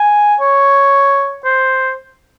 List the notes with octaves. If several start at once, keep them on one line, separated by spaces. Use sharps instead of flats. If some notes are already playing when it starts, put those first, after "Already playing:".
Already playing: G#5
C#5
C5